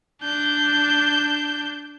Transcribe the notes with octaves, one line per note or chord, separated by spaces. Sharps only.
D4 G6